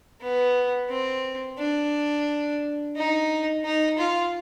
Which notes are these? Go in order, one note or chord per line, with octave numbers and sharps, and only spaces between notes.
B3
C4
D4
D#4
D#4
F4